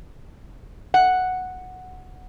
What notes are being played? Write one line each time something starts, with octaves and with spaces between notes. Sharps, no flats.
F#5